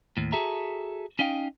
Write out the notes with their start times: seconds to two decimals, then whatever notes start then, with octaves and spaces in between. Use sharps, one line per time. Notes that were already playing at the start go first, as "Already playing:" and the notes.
0.17 D#2 A2
0.32 F#4 G#4 A4 E5 A#5
1.19 C#4 D#4 D#5 F5 G5